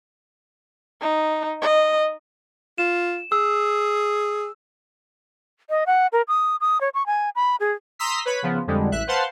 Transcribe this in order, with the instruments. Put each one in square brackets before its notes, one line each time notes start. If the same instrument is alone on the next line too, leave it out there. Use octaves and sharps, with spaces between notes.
[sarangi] D#4
D#5
[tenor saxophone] F4 [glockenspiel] E7
[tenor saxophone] G#4 [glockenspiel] E6
[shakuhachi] D#5
F#5
A#4
D#6
D#6
C#5
C#6
G#5
B5
G#4
[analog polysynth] A#5 C6 D#6 E6 B6
B4 C#5 B5
C#3 F3 B3
F2 D3 G3 G#3
A1 E5 F#6
B4 C5 F5 F#5 A5 C6